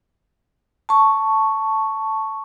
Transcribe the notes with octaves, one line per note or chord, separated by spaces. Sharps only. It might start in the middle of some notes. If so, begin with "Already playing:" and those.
A5 C#6